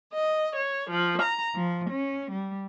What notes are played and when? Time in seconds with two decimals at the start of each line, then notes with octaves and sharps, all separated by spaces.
0.14 D#5
0.56 C#5
0.91 F3
1.22 A#5
1.56 F3
1.89 C#4
2.32 G3